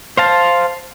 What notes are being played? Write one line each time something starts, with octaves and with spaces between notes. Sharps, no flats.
C5 F5 A5